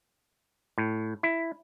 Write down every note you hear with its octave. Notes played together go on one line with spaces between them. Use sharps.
A2
E4